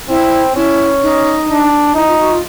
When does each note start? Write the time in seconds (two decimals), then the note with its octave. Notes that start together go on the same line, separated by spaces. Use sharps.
0.09 C4 E4
0.55 C#4 E4
1.02 D#4
1.49 D4
1.95 D#4 E4
2.06 F4
2.19 F#4
2.30 F4